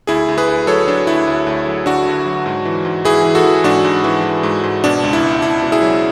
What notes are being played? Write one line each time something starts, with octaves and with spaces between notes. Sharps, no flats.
D2 E4 G#4
D2
G#4 B4
D2
F#3 A4 C#5
F#3 D4
D2 E4
D2
D2
F#3
D2 D4 F#4
D3
F#3
G#2
E3
G#2
E3 E4 G#4
E3
F#4 A4
E3
G#2 D4 F#4
G#2
E3
E3
G#2
G#2
B2 D4
C#2
E4
C#2
C#2 E4
B2
E4 G#4
F#3